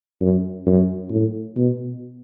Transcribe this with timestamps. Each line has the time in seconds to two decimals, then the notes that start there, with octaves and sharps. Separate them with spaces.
0.21 F#2
0.66 F#2
1.11 A2
1.56 B2